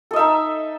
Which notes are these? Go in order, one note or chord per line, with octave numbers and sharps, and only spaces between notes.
D#4 A4 D#5 E5